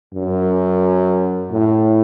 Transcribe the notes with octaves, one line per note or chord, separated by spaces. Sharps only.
F#2
A2